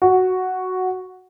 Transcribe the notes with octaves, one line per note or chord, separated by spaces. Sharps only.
F#4